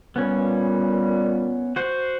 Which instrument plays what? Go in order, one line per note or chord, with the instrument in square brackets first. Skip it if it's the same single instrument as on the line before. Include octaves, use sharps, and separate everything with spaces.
[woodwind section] A#2 G3 [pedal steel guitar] B3 C#4
[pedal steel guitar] F#4 C5